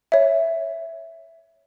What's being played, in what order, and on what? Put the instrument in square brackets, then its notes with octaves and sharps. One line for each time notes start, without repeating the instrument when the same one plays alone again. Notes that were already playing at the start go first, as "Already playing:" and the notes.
[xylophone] C#5 E5